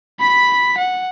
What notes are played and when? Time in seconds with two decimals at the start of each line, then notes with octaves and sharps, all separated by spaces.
0.20 B5 B6
0.78 F#5